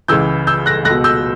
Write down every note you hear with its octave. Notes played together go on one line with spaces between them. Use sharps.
C#2 C#3 E3 E6 G6
E6 G6
F#6 A#6
C#2 B2 F#6 A#6
E6 G6